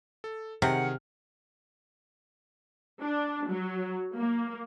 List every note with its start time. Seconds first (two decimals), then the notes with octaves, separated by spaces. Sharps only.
0.24 A4
0.62 C3 D#3 G#4 F#5 F6
3.02 D4
3.49 F#3
4.17 A#3